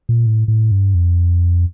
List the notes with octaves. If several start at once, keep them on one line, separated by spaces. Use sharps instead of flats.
A#2
A2
A2
G2
F2